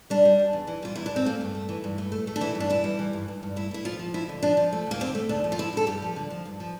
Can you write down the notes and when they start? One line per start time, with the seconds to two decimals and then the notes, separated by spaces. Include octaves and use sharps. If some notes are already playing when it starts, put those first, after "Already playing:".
0.10 G3 D4
0.25 G3
0.39 E2
0.53 E2
0.67 E3
0.82 G3 F4
0.96 E2 E4
1.06 D4
1.11 E2 C4
1.25 A3 A#3
1.41 G2
1.55 A3
1.69 E3
1.84 G2
1.98 A3
2.12 A3
2.27 A3
2.36 D4
2.41 E3 E4
2.55 G2
2.60 D4
2.70 E3 E4
2.84 G3
2.99 E3
3.13 G2
3.28 G2
3.43 G2
3.56 A3 E4
3.71 A3 E4
3.85 F3 F4
3.99 F3
4.14 F2 E4
4.29 D3
4.43 F3 D4
4.57 F3
4.73 A3
4.86 D2 A#3
5.00 D3 C4
5.15 A3
5.29 D2 D4
5.44 F3
5.52 F4
5.58 F3 E4
5.73 D3 A4
5.87 G2 G4
6.02 F3
6.16 D3
6.30 F3
6.45 G2
6.60 F3